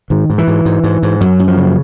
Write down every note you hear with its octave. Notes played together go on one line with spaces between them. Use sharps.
G#2 D#3
G#2
E3
G#2
G#2
G#2
G#2
F#2 F#3
F#2
F3
C#3